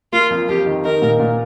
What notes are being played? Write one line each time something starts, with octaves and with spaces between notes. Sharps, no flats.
A#3 F4
F2
F2 G4
D#3
D#4 A#4
A#2
A#2